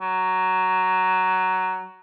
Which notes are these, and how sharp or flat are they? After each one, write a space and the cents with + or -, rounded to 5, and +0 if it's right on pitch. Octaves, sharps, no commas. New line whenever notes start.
F#3 +10